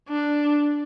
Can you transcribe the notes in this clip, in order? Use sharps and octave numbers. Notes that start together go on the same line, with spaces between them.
D4